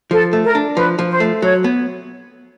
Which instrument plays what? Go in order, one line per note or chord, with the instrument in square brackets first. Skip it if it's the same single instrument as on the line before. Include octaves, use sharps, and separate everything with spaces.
[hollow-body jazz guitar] F3 [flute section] A4
[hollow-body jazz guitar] A3
[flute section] A#4
[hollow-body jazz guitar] D4
[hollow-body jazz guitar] F3 [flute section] B4
[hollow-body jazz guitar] F3
[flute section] C5
[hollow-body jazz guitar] A3
[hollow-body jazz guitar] F#3 [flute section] C#5
[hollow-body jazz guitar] B3